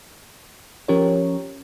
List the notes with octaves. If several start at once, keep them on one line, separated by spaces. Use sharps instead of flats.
F3 C#4 G4 A#4 C#5